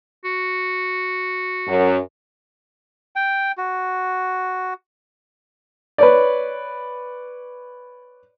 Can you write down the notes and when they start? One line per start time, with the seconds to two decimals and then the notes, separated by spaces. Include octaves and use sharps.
0.25 F#4
1.67 F#2
3.16 G5
3.58 F#4
5.98 B4 C#5 D5